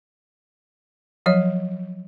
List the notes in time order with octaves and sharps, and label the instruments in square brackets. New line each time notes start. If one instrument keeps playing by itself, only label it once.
[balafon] F3 F#3 C#5